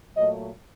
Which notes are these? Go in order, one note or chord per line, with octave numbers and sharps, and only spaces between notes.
A#2 F#3 A3 D#5